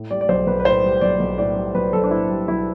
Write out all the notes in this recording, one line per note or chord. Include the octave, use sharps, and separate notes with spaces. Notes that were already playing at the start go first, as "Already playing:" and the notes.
Already playing: A2
G3 D5
D5
B1 C5
B1 B4
B4
A2 C5
G3
B1 D5
B1
A2 D5
G3
B1 B4
B1 A4
D4
A2 E4
G3
B1 E4